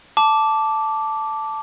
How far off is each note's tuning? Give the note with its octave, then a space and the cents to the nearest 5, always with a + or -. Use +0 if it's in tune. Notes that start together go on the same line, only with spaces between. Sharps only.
A5 +0 D6 -5